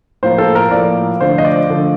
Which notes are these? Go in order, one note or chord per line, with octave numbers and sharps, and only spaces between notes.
A2 F3 A#3 C5
A4
A#4
A2 F3 A#3 D5
D3 F3 A3 C5
D#5
D5
D3 F3 A3